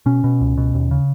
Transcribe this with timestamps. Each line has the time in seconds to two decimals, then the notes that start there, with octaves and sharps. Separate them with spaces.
0.06 B2 C#4
0.24 B2
0.41 C#2
0.57 B2
0.74 D#2
0.91 C#3